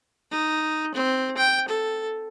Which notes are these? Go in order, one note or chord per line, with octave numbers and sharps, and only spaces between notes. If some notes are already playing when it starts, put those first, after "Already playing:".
D#4
C4
G5
A4